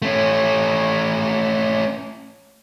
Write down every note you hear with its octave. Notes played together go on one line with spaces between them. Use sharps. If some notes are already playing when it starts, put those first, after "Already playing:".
A3 C#4